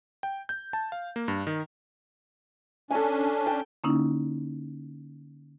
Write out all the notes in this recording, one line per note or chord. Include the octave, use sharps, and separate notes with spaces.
G5
G6
A5
F5
A#3
G2
D#3
C#4 D4 A4 G#5
G5 A5
D3 A#3 C#4 D#4 E4